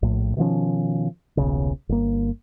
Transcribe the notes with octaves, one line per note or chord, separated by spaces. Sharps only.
A#1 A2
B2 D#3 F3 C#4
D#1 B1 C#3
G1 A#3